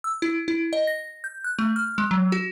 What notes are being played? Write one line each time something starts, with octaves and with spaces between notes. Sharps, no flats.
E6
E4
E4
D#5
A#6
G6
F#6
A3
F6
G#3
F#3
F#4